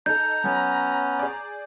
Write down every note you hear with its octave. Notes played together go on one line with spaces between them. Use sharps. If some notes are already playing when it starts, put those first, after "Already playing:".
D#4 A4 A#5 G6
F#3 B3 C#4
G#4 D5